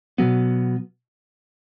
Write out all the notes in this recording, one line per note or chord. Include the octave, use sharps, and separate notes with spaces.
B2 F#3 B3